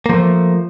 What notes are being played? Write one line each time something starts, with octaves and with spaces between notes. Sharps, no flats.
F3 A3 A#3